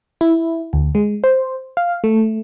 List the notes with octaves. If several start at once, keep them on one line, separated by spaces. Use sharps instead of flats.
E4
D2
G#3
C5
F5
A3